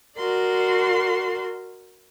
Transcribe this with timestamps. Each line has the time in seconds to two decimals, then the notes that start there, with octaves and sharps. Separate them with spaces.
0.16 F#4 A#4 D5 C6